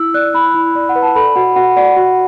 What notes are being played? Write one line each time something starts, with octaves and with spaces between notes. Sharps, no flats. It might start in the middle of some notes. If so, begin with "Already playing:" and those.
Already playing: E4 E6
D5 F#6
E4 B5
E4
D5
F#5
B4
A5
A4 B5
F#4 F#5
F#4 F#5
D5 F#5
F#4